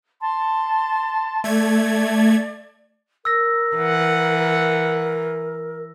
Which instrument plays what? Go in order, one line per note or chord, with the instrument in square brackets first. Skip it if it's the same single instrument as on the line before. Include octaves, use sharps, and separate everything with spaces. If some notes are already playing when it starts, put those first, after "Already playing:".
[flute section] A5 C6
[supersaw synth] A3 G#6 [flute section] D5
[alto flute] A#4 [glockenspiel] E6 A#6
[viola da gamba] E3 [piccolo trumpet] F#5